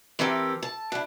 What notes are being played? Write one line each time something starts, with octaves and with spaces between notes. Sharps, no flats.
E3 C4 G4 A4 A#4
A5
D4 E4